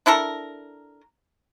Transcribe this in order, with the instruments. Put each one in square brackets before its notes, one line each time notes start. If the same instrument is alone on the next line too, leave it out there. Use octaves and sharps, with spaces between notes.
[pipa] D4 E4 A4 A#4